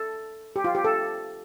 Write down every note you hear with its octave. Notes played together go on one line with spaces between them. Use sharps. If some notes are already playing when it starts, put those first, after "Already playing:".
Already playing: A4
G4
F4
G4
A4